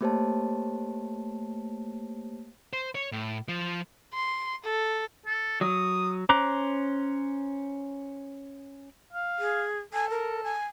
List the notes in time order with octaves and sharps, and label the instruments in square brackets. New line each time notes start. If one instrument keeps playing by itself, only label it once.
[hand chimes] A3 A#3 G4 C5 C#5 A5
[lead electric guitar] C5
C#5
A2
F3
[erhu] C6
A4
[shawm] A4
[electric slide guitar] F#3 [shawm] D#6
[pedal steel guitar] C#4 C5 A#5 D6 F#6
[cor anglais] F5
[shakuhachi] G#4
[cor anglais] A4 [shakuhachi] G#5
[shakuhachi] A#4
G#5